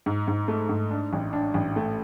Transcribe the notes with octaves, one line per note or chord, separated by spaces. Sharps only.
G#2
G#2
A3
G#2
D4
A1
D4
A1
A3